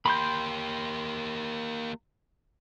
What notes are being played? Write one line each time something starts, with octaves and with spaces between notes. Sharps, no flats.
A#3 G4 B5 C6 G6